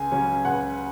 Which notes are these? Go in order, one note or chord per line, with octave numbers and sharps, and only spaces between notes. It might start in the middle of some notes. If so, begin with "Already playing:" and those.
Already playing: C#2 G#5
C#3 F#3 C#4
C#2 F#5